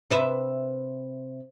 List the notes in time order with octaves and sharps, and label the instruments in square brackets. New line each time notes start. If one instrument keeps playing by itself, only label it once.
[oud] C3 B4 E5